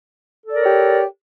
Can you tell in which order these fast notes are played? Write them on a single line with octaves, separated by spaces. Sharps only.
A4 D5 A#4 C#5 G4